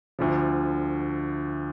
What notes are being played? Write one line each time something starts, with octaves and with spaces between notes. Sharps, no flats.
D2 D3 F3